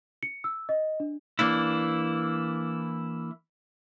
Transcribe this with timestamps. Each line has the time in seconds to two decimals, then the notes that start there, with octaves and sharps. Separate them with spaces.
0.23 C#7
0.44 E6
0.69 D#5
1.00 D4
1.39 E3 A#3 D4 E4